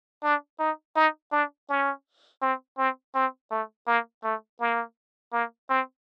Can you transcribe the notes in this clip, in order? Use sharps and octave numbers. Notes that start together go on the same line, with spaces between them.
D4
D#4
D#4
D4
C#4
C4
C4
C4
A3
A#3
A3
A#3
A#3
C4